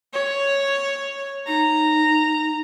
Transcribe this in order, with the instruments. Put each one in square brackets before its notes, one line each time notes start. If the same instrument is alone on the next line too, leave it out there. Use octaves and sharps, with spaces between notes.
[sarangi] C#5
[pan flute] D#4 [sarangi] A#5